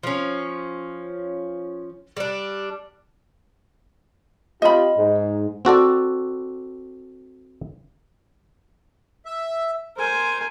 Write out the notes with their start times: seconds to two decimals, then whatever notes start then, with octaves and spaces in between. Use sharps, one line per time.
0.03 F3 C#4
2.17 G3 D4
4.62 C4 F4 G4 D#5 B5
4.98 G#2
5.65 C4 F#4 A4 D5
9.26 E5
9.98 A#4 C5 G#5